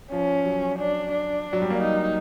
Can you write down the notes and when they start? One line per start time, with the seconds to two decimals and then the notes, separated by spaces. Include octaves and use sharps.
0.12 F3 C#4
0.45 F#3
0.79 D4
1.12 D4
1.53 F#3
1.62 G3
1.70 A#3
1.78 D#4